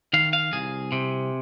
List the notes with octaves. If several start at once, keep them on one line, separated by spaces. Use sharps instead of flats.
D#3 F5
F5
C2 G#4
C3